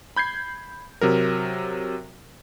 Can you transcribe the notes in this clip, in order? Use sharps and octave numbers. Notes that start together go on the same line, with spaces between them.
B5 G6 G#6 C7
C3 F#3 A#4